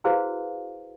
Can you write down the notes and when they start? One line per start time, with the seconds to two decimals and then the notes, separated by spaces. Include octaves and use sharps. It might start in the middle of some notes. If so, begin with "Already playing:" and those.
0.04 E4 F#4 G#4 B4 C5 F5